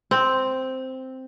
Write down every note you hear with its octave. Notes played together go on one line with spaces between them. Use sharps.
C4